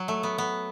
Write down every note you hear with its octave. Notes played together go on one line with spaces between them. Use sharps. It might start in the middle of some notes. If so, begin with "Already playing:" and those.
Already playing: F#3
A3
B3
B3